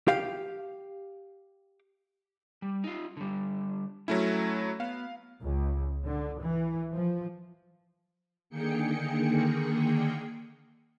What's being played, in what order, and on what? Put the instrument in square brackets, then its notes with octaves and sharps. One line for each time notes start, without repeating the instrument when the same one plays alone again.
[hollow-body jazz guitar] G4 F5
[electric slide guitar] G3
D#4 F4
D3 G3
[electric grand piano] F#3 A3 E4 [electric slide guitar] C#4
[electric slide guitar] B3 [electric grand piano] F5
[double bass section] C#2
D3
E3
F3
[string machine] D3 D#3 A#3 G#4 G5 C#7